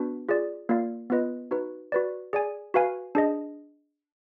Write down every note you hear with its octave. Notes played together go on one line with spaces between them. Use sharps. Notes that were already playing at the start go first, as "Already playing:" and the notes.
Already playing: B3 D4 F#4 B4
F4 G#4 D5
A#3 F4 A#4 D5 F5
B3 F4 B4 D#5
D#4 F#4 B4
F#4 B4 D5
G#4 D5 G#5
F#4 B4 F5 G#5
D4 G#4 D#5